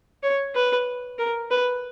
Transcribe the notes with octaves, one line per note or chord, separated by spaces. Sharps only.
C#5
B4
A#4
B4